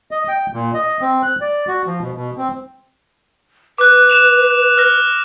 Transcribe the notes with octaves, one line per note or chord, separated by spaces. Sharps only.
D#5
G5
A#2
D#5
C4
F#6
D5
F#4
F3
B2
B2
C4
B4 D6 F#6
F#6 E7 F7
F6 F#6 A#6